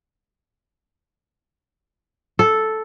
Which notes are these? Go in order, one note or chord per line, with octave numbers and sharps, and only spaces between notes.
A4